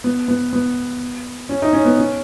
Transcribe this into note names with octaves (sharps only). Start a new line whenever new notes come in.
B3
B3
B3
C#4
D#4
C#4
B3
C#4